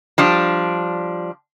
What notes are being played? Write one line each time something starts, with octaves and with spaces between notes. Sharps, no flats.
F3 G3 D4